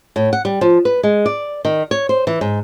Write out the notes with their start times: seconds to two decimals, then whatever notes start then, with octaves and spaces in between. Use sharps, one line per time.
0.16 A2
0.33 F#5
0.45 G3
0.61 F3
0.85 B4
1.03 G#3
1.26 D5
1.65 D#3
1.91 C#5
2.09 C5
2.27 E3
2.41 G#2